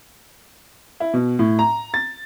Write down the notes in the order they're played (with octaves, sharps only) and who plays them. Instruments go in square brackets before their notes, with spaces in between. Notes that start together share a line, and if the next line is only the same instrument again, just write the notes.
[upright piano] E4
B2
A2
A#5
A6